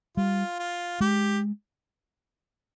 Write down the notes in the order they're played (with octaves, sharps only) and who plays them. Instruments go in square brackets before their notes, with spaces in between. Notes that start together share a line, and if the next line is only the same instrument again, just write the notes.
[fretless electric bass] G3 [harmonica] F4
[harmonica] F4
[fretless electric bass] G#3 [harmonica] G4